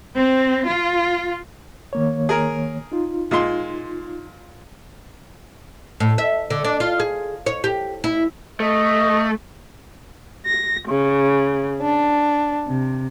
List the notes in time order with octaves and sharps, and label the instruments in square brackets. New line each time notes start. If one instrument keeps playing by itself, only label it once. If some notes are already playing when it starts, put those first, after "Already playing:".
[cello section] C4
F4
[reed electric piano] D#3 A#3 C#5
[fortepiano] G#4 A#4
[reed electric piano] D#4 F4
[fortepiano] A#2 G#3 C6
[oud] A2
E5
D3
D4
F4
G#4
C#5
G4
E4
[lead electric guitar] A3 [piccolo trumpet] D#5
[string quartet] A#6
C#3
D4
C3